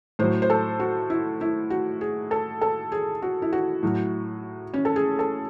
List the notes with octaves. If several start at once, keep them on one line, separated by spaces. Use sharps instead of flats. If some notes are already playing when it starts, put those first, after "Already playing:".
A2 F#3 C5
C5
A4
F#4
E4
E4
F#4
G#4
A4
A4
G#4
F#4
E4
F#4
A2 F#3
C#4
A4
G#4
A4